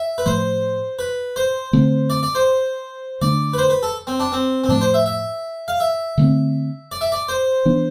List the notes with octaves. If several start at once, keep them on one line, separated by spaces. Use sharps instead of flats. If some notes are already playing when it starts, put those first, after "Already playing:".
Already playing: E5
B4
A2 F3 A3 C5
B4
C5
D3 A3 C4
D5
D5
C5
D3 A3 D4 D5
B4
C5
B4
A4
C4
D4
C4
C4
A2 F3 A3 D4
C5
E5
E5
F5
E5
D3 A3 C4
D5
E5
D5
C5
E3 B3 D4